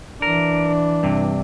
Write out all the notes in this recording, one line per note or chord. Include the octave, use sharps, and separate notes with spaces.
E3 D4 A#4
G2 C3